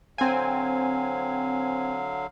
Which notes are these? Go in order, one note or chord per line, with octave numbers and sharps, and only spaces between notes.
D3 F#3 C4 F5 G#5